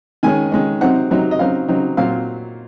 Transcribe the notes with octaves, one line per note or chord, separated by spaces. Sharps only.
D#3 G#3 C#4 G#5
D#3 G#3 C#4
C3 F#3 C4 D#4 F#5
C3 F#3 C4 D#4
D#5
C#3 F#3 C4 D#4 F5
C#3 F#3 C4 D#4
A#2 F#3 C4 F5